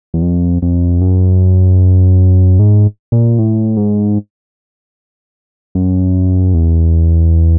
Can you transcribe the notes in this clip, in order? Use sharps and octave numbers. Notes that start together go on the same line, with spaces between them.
E2
F2
F2
F#2
G#2
A#2
A2
G#2
F#2
E2